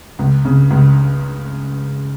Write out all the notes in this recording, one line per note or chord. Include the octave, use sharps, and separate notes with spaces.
C#2
C#3
C#2